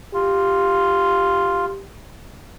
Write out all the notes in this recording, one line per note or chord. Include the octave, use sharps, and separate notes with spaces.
F4 G4